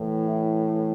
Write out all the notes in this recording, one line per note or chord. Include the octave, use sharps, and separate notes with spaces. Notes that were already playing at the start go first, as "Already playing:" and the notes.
Already playing: A2 E3
E4